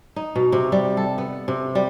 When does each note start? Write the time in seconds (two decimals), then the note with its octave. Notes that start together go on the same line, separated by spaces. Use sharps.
0.16 D#4
0.35 B2
0.52 C3
0.72 G3
0.97 A4
1.18 B3
1.48 C3
1.75 G3